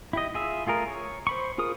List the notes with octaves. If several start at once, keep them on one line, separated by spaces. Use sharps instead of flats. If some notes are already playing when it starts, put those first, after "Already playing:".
E4 G4 D#5
F4 G#4 E5
A3 F4 G#4 A#4
C#5
C5 B5 C#6
F4 G#4 A#4 D#6